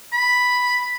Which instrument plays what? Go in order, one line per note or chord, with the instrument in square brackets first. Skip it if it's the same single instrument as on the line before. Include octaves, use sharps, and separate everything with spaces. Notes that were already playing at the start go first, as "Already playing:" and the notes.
[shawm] B5